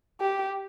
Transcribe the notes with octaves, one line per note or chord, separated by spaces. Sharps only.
G4